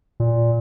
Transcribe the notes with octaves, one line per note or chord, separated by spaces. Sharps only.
A#2